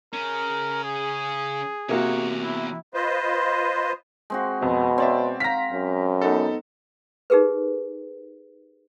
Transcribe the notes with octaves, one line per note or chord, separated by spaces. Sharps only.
C#3 C#4 A#4
G#4
E2 C3 A#3 F#4 C#5
E4
F4 B4 C5 D#5
G#3 C4 F#4
F2 B2
C4 C#5 D5 E5
F5 A#5 A#6 B6
F#2
B3 D#4 A4
D#4 G4 G#4 A#4 B4